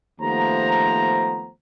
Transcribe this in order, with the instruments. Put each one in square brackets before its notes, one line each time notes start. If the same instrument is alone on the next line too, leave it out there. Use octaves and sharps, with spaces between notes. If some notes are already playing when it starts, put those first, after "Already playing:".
[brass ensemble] D#2 F3 A3 B3 C5 A#5